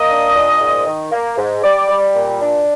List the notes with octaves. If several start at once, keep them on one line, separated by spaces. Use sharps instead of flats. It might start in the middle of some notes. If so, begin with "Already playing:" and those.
Already playing: A#3 D#5
D4
A#2
G#2
D#3
A#3
G#2
G3 D5
G3
A#2
D4